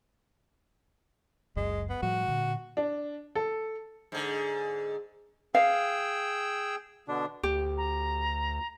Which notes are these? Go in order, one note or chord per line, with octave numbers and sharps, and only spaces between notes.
F#1 C#2 F#2 G#3
B3
A2 F3 G3 F#4
A#2 D3
D4
A4
G#2 D3
G#4 F5 G5 E6
B2 D3 D4
D2 G4
A#5